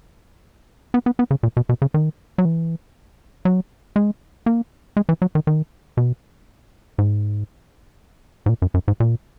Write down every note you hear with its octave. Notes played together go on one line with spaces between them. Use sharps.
B3
B3
B3
C#3
A#2
B2
B2
C#3
D#3
F#3
E3
F#3
G#3
A#3
G#3
E3
F#3
D#3
D#3
B2
G#2
G#2
A#2
F#2
F#2
G#2
A#2